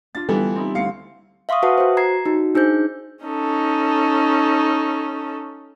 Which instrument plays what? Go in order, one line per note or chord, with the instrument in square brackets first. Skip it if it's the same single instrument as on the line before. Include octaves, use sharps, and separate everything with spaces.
[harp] D4 F4 [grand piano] A6
[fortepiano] D3 E3 B3 [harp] G3 [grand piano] A4
[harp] C4 D#4 E4
[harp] D2 C4 [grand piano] F5 C#7
[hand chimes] E5 F5 C6 C#6 D#6
F#4 B4 E5 F#5 A5 D#6
F#4 C5
A#5 G#6 C7
D#4 F#4
D4 D#4 G#4 C5 G6
[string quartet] C#4 D#4 A4